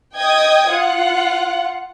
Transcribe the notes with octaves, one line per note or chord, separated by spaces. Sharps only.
D#5 G5 D#6 G#6
F4 F#5